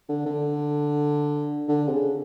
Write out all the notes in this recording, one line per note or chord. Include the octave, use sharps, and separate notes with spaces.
D3
D3
D3
C3
C#3